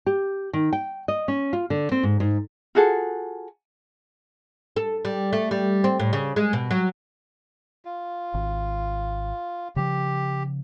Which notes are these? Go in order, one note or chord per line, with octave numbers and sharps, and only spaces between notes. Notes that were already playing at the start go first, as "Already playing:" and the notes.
G4
D#3
G5
D#5
C#4
F4
D3
C4
G#2
G#2
F4 F#4 G#4 A4
A4
G3
A3
G3
C4
A2
C#3
G#3
B2
F#3
F4
G#1
C#3 F3 G4